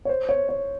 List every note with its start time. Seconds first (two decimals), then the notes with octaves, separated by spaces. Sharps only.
0.05 C#5
0.09 C5
0.29 C#5
0.49 C#5